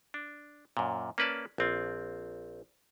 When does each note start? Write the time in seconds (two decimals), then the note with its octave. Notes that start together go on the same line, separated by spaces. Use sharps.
0.14 D4
0.77 F#2 A#2
1.18 A#3 C#4 B4 D5 A5
1.58 A#1 C4 F4